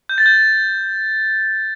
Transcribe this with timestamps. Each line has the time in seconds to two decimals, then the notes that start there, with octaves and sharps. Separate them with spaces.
0.09 G6
0.18 A6
0.26 G6